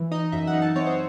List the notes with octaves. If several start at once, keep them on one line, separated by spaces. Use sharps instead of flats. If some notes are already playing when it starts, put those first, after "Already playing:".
Already playing: E3
D#4 D#5
F#2 E5
F#5
D#4
A5
C4 C#5
C5